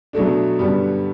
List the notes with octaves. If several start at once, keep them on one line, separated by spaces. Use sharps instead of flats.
B2 F#3 A3 D4
G2 D3 G3 B3